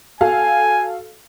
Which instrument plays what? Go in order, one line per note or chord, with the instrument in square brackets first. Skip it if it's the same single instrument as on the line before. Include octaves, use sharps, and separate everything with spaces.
[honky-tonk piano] F#4 A4 F5 [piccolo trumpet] G#5